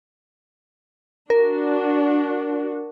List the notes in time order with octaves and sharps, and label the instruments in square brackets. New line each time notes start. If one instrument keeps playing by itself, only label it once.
[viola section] D4 F#4 [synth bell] A#4